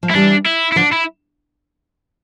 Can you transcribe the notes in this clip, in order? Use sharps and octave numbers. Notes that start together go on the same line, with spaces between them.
F3
E4
E3 G3 D4
E4
E4
D3 F3 D4
E4